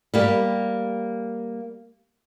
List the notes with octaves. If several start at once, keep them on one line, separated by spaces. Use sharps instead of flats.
G3 A#3 G4